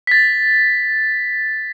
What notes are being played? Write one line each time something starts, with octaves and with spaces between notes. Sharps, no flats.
A6 B6